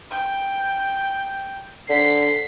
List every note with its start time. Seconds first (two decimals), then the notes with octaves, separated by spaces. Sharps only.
0.11 G5
1.89 D3 B6 C7